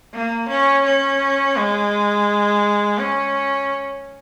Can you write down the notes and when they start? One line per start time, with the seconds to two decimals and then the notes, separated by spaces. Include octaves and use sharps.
0.13 A#3
0.48 C#4
0.85 C#4
1.56 G#3
2.99 C#4